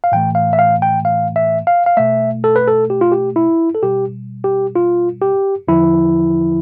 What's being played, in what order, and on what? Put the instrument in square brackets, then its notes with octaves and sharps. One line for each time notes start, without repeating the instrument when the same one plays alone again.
[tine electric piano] F5
A2 E3 A3 G5
F5
E5
F5
G5
F5
E5
F5
F5
B2 A3 E5
A4
B4
A4
G4
F4
G4
E4
A4
B2 G3 G4
G4
F4
G4
E2 D3 F3 E4